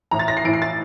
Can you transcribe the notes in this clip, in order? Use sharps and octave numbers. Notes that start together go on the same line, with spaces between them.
A2 E3 A#5
A6
A#6
C7
A2 E3 D7
C7
A6